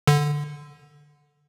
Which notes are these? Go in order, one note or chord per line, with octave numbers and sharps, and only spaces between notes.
D3